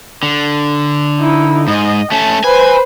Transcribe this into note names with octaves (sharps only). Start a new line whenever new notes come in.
D3
D#4 E4
G#2 D#5
A3 C#4 A5
B4 C5 G#5